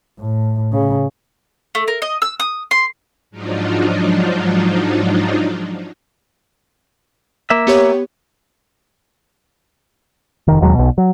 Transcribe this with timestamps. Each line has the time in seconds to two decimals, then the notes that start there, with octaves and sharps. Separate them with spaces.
0.19 A2
0.72 C#3
1.75 A3
1.88 A#4
2.02 D#5
2.22 E6
2.40 D#6
2.71 C6
3.31 G#2 F3 F#3 D4 D#4 F4
7.50 A#3 E5
7.67 B3 G4 C#5
10.48 F1 D#3
10.61 E1 D#2 F#3 G#3
10.75 B1 B2
10.98 F#3